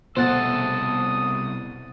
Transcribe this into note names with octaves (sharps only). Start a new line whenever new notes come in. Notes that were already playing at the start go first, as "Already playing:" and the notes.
C2 B2 A4 C5 F#5 A5 D#6